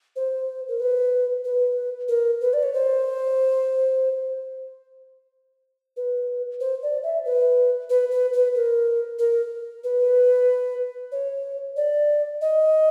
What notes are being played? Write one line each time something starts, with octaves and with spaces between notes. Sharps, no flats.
C5
A#4
B4
B4
A#4
B4
D5
C#5
C5
B4
C5
D5
E5
B4
B4
B4
B4
A#4
A#4
B4
C#5
D5
D#5